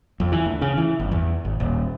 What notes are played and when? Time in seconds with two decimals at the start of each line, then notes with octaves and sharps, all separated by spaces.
0.20 F2
0.32 E3
0.46 D2
0.61 C#3
0.77 E3
1.00 G1
1.12 E2
1.45 G#1
1.60 D#1